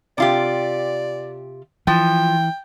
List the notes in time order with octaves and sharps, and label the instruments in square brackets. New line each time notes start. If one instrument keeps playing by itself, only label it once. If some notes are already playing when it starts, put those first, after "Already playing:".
[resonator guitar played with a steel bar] C3 F4 G4 [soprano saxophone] D5
[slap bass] E3 [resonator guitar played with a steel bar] F3 [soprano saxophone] G5